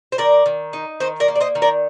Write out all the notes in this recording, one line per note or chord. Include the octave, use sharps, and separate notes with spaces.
C5
D#3 A#4 D5
D#3
D#4
D#3 C5 D#5
A#4 D5
A#3
D5
C5 D#5
D#3
A#4 D5